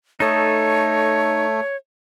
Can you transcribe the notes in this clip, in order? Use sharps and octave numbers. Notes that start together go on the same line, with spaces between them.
A3 D#4 A4 C#5 D#6